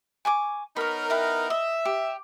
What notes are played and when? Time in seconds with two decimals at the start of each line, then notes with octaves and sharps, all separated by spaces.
0.25 G#5 C#6 D6
0.76 B3 D#4 A#4 C#5 B5
1.10 E4 B4 G5
1.50 D#5 E5
1.85 G4